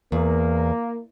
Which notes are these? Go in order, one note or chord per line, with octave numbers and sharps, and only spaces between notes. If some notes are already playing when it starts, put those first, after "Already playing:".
E2 A#3